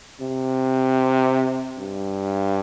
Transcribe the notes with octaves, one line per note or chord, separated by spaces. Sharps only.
C3
G2